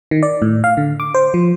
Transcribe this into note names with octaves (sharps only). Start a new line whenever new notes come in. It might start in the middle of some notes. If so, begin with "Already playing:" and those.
D#3
D5
A2
F5
D3
D6
C5
F3